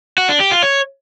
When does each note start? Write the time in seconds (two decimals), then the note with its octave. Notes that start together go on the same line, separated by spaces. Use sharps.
0.18 F#4
0.29 D4
0.40 G4
0.51 F4
0.63 C#5